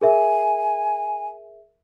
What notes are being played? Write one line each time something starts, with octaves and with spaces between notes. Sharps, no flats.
G#4 A#4 E5 G#5